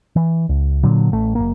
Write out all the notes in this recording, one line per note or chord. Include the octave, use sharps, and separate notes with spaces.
E3
C#2
A#2 D3 F#3
A1 A3
F#1 A#3